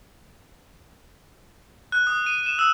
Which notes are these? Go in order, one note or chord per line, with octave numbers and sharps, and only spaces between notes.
F#6
D#6
D#7
E7
E6